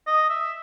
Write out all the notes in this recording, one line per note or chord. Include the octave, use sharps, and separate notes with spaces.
D#5
E5